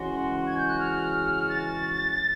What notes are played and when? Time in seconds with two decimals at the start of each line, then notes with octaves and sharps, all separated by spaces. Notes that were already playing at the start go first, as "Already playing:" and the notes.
Already playing: C#3 E3 G#3 C#4 F#4 C6
0.46 G#6
0.57 G6
0.68 F#6
0.79 F6
1.49 A6